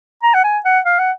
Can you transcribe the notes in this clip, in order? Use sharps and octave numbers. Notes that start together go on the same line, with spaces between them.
A#5
F#5
G#5
F#5
F5
F#5